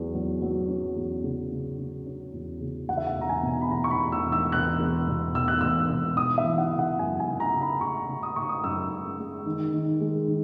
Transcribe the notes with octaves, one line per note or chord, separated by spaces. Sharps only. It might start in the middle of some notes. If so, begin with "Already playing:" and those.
Already playing: E2 F#3
F#3
F#3
C#4
E2
C#3
C#3
C#3
C#4
E2
C#3
E2 F#5
E5
F#5
E1
A#5
G#5
B2
B5
E2 A#5
C#6
B5
E2
E6
E1
E6
E1 F#6
E2
B2
E1 E6
F#6
E1 E6
B2
E3 D#6
E5
E3
F#5
C#3
F#5
F#2 G#5
G#5
C#3
A#5
C#3
B5
C#3 C#6
C#3
D#6
C#3 C#6
D#6
F#2 E6
G#3
G#3
D#3
D#3
G#3
D#3